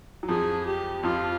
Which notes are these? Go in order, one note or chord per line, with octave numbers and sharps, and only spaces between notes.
F#3
F2 F3 G#4
G4
F2 F3 F4